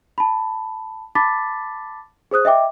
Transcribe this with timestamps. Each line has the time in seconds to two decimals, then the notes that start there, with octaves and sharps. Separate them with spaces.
0.18 A5 B5
1.15 A5 B5 D6 A6 B6
2.31 G#4 C5 D#6 F#6
2.45 D#5 E5 G5 D6